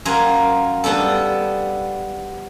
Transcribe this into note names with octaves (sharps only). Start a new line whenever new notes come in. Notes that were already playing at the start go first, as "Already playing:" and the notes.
F#2 F4 A#4 G#5
G3 B3 D4 A4